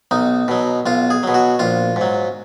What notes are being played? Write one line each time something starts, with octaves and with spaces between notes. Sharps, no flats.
B1 D#4
B2 F#3
B1 F4
G#4
B2 F#3
F#4
A#1 F4
G#2
F#3